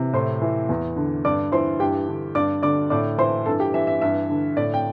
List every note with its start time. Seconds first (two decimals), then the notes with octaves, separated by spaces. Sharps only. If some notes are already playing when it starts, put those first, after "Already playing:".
Already playing: C3 E3
0.13 A2 C5 C6
0.42 E3
0.69 E2
0.96 D3
1.25 G2 D5 D6
1.52 E3 C5 C6
1.80 G2 G4 G5
2.08 D3
2.35 G2 D5 D6
2.63 D3 D5 D6
2.90 A2 D5 D6
3.18 E3 C5 C6
3.46 G2 A4 A5
3.60 G4 G5
3.74 E3 E5
3.87 E5
4.01 G2 E5
4.30 D3
4.57 A2 D5
4.74 G5